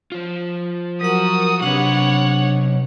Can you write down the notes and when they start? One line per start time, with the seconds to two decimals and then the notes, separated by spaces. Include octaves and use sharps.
0.12 F3 F4
1.01 F#3 F#4 A#4 F#5 D#6
1.62 C3 F#3 D4 B4 C#5 F#5